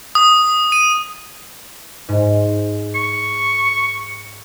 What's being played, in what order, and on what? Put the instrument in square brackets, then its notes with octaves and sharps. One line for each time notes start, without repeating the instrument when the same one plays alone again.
[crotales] D#6
D#7
[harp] G#2
[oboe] C#6